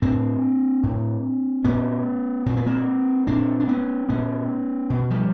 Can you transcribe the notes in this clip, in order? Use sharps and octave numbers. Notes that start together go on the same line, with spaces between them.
A2 C4 D4
A2
A#2 B3 C#4
A#2 C4
B3
A#3 C4
A#2 C4 D4
D4
B3 C#4
A#2 B3 C#4
B2
F3 G3